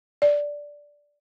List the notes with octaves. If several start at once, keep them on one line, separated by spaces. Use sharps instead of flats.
D5